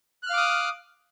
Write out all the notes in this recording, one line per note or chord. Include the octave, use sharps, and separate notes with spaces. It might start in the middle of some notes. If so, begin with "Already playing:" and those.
F5 D6 D#6 F6 F#6